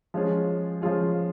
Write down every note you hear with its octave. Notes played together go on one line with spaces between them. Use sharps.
F3 G#3 C#4 F4 G#4
F3 G#3 C#4 F4 G#4